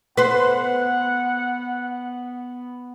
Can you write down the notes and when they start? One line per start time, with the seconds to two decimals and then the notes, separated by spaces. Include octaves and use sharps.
0.17 B3 B4 C5 F#5